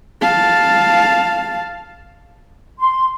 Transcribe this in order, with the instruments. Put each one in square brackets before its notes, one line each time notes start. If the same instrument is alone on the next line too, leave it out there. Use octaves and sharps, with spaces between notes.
[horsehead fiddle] F5 A5
[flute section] C6